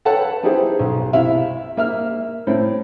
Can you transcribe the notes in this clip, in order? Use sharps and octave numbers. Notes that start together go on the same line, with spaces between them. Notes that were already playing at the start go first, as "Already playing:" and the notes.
A4 B4 C#5 F#5 G5 A5
B3 D#4 E4 G4 G#4 C5
B1
C3 E4 E5 F5
A#3 E5 F6
A2 C4